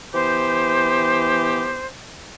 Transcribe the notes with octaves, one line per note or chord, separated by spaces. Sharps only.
E3 B3 G4 C5